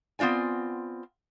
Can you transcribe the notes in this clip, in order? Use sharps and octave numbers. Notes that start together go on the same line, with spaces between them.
B3 C4 F4 D5 G#5